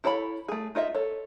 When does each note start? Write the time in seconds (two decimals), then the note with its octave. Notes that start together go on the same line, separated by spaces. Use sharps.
0.04 E4 A4 C#5 A5 B5
0.48 A3 G#4
0.75 D#4 F4 D#5 E5
0.94 A4 C#5